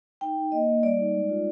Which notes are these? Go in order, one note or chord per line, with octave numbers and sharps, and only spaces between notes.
D#4 G5
D#4
A#3 D#5
A#3
G3 D5
D#4
G#3
F4